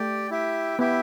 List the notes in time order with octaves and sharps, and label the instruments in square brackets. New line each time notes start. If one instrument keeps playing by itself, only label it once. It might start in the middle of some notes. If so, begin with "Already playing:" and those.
Already playing: [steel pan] A3 [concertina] G4 D5 G5
[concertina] E4 G4 E5 G5
[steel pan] B3 [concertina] E4 G4 E5 G5